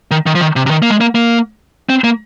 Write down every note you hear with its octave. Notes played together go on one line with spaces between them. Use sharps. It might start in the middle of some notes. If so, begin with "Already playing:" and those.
D#3
D#3
F3
D#3
C3
C3
D#3
A#3
G#3
A#3
A#3
C4
A#3